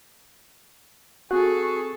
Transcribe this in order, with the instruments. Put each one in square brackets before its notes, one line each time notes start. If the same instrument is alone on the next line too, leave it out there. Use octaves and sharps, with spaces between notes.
[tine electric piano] C4 F#6 [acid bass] F#4 [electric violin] G#4 A4 [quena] C#6